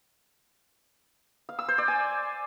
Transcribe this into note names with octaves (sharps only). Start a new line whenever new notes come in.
F5
E6
C5
D5
G#5